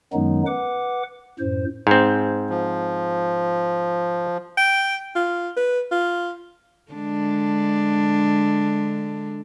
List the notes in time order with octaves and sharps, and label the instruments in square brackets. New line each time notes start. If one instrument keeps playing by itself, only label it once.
[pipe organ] F#2 D#3 F#3 G#3 B3 D#4
B4 F#5 D6
F#2 A2 C5
[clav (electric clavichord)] G#2 C4
[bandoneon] F3
[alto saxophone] G5
F4
B4
F4
[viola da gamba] D3 G#3 D4